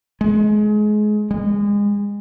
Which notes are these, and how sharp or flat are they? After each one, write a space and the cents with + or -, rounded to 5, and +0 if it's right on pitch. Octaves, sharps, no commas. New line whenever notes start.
G#3 +25
G#3 -30